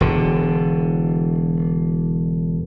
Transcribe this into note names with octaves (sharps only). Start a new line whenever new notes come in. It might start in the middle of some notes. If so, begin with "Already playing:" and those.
E1 D3